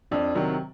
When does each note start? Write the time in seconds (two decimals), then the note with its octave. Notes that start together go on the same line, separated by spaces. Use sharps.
0.11 F2 D4
0.35 C3 D#3 F#3